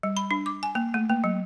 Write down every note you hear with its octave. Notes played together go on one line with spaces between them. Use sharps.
G3
B5
D4
D6
G#5
A#3
A3
A#3
F#3